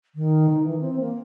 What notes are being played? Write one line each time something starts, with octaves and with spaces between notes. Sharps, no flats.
D#3
D#4
E3
C4
A#3